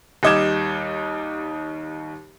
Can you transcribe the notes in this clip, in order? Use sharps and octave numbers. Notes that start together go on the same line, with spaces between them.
D#2 G3 D#4 D6 G#6 E7